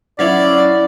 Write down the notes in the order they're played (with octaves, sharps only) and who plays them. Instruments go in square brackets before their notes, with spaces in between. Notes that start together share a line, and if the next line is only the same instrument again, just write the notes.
[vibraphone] F#3 C#4 F#5 [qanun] E4 C#5 F5 [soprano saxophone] D5